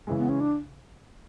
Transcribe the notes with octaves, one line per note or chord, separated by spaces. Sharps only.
C#3 E3 G#3
B3
C#4
D4